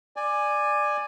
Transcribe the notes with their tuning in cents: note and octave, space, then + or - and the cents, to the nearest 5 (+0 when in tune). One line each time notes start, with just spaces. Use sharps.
D5 +15 G#5 -5